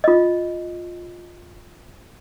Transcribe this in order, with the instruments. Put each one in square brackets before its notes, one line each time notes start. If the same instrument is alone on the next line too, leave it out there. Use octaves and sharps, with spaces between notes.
[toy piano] F4 D#5